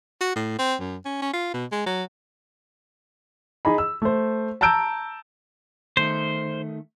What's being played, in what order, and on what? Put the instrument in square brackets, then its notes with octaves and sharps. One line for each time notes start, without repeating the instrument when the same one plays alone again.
[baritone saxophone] F#4
A2
C4
F#2
C#4
C#4
F4
B2
G#3
F#3
[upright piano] D#4 G#4 D#5 B5
E6
A3 C5
A5 A#5 E6 G6 D7
[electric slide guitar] D#3 A3 [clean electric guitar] C5